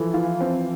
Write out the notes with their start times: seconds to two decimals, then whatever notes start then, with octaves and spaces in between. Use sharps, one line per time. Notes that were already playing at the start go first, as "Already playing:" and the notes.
Already playing: E3 F3 A4
0.14 F4
0.41 C4